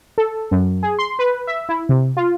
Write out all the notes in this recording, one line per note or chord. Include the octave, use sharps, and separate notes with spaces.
A4
F#2
G#4
C6
B4
E5
E4
C3
F4